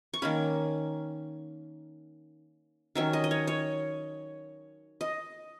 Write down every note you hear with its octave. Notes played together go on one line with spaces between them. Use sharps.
C#6
D#3 A#3 C#4 B5
D#3 F#3 C#4 E5
D#5
D#5
C#5
C#5
D#5